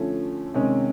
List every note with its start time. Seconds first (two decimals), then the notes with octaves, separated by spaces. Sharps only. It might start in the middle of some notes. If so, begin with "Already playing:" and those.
Already playing: D3 F3 A3 C#4
0.54 C3 D#3 G#3 C#4